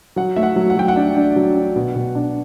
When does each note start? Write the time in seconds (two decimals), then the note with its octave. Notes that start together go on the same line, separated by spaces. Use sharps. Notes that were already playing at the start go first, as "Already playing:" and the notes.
0.16 F#3 F#5
0.36 A3 E5
0.43 F#5
0.56 F#3
0.70 F#5
0.77 F#3 G5
0.88 F#5
0.96 D4
1.16 D4
1.36 F#3
1.56 D4
1.76 B2
1.95 B2
2.15 D4